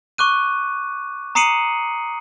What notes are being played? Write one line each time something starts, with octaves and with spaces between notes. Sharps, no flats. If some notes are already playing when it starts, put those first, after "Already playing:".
C#6 D6 F#6 D#7
A#5 D#6 C7 C#7 D#7 F#7